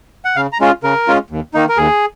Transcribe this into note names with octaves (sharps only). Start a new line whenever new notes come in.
F#5
C#3 F5
A#5
G#3 C#4 F4
C#3 A#4
G#3 C#4 F4
D#2
D#3 A#3 D#4
A#4
D#2 G#4